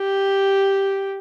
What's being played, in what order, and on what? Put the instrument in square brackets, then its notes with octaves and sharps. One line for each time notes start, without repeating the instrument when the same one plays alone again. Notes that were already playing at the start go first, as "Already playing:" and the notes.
Already playing: [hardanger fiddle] G4